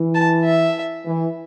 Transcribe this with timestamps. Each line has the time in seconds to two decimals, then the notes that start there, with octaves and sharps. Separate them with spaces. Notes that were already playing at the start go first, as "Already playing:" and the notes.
Already playing: E3
0.15 A5
0.45 E5
1.05 E3